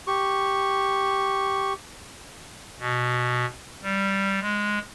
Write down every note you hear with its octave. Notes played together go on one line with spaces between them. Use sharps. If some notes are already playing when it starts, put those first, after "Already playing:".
G4 C#6
B2
G3
G#3